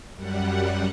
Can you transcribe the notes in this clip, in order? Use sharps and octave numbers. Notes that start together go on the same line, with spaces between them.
F#2 G3 F#5